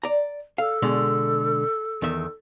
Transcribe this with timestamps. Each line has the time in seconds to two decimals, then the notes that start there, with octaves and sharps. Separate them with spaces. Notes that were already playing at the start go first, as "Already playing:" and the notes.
0.04 D5 A#5
0.58 A4 F5
0.82 B2 D3 G#3
2.02 E2 D#3 E5